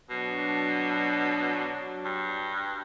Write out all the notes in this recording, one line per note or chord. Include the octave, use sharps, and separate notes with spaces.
B2 F#3 D4
G2